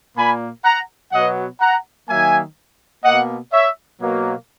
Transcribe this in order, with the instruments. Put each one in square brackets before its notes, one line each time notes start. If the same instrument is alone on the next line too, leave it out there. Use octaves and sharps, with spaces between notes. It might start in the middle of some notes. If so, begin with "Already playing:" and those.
[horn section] A#2 A#3 G#5 B5
F#5 A#5
B2 F#3 B3 D#5 F#5
F#5 A#5
D#3 F#3 A#3 E5 G#5
B2 A#3 D#5 F#5
C#5 E5
B2 F#3 A#3